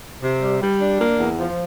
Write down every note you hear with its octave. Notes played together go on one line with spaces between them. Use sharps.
C3
G3
G3
D4
A#3
E2
F3